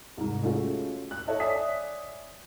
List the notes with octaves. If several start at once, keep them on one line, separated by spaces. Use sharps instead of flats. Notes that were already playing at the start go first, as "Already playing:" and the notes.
C2 G#2
G#3 A3 C#4 F4 F#4
F#6
A4 C#5 D#5 E5 A5
C#5 D5 E5 G#5 D#6 B6